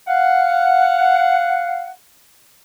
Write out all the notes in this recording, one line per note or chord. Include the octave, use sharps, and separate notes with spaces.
F5 F#5